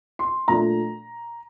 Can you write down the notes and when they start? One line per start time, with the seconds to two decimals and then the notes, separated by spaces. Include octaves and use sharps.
0.19 C6
0.48 A#2 F3 A3 D4 A#5